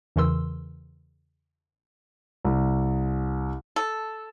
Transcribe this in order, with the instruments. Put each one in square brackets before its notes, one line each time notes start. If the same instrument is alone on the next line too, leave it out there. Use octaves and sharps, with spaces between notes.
[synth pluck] E2 C#3 E3 A#4 C6 E6
[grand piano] C2
[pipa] A4